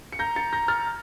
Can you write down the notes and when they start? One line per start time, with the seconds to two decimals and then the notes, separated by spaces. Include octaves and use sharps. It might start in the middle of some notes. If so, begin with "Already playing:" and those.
0.13 C#7
0.19 A#5 G6 A#6
0.36 A6 C#7
0.53 G6 A#6
0.68 F6 A6